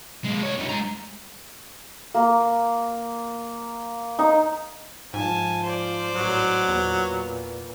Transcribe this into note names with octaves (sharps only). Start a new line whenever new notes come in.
G#3 A#3
C2 C#5
F#2 D3
G#3 A#5
A#3
D#4
G#2 F3 G#5 A5
C5 D5
A1 F#3
E2 A#2 B3